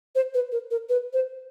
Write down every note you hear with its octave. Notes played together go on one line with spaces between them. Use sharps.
C5
B4
A#4
A#4
B4
C5